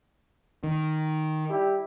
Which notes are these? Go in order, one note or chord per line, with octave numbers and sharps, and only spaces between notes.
D#3
G3 E4 G4